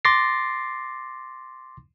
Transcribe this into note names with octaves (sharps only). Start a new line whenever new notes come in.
C6 D6 A6 A#6 C7